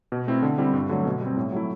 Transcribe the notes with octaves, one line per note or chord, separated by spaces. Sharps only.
B2
A3 C4 E4
D3
G3 C4 E4
G2
D3 F#3 A3
B2
G3 C4
A2
F#3 A3 E4